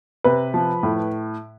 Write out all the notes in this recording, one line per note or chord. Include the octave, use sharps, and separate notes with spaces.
C3 B4
F3
A2